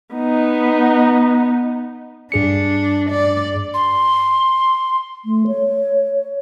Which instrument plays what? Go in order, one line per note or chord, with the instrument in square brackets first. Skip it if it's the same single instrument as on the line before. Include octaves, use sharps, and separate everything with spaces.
[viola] B3 D#4
[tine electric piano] G2 G#4 C#7 [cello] D4
[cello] D5
[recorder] C6
[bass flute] A3
C#5